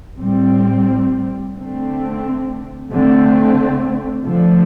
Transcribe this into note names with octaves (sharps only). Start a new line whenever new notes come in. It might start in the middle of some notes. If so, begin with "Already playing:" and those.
A2 G3 C4
D3 A3 C4
D3 A3 C4
D3 F3 A3